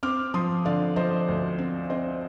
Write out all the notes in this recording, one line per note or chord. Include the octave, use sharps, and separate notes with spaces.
C4 D6 F6
F3 C6 D#6
D3 D5 F5
F3 C5 D#5
D2
C4
C4 C5 D#5